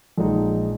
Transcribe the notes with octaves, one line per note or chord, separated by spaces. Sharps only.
A#1 A#2 G#3 D#4